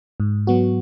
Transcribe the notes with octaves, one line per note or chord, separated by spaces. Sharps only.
G#2
F#3 B3 F#4